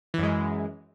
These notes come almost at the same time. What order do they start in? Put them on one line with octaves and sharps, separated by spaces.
E3 F#2 G#3